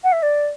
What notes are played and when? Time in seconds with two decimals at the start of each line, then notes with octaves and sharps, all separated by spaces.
0.04 F#5
0.12 E5
0.22 D5